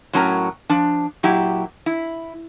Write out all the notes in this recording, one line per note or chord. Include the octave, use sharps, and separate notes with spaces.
A2 F#3 C#4 A#4 A#5
F3 D4
A#2 F#3 E4 G4
E4